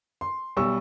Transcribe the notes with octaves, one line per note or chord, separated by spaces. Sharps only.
C6
B1 G3 C#6 E6